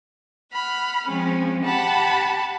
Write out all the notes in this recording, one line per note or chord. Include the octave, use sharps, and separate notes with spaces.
F#5 B5 F6
F3 G#3 C4 C#4
G4 F#5 A5 B5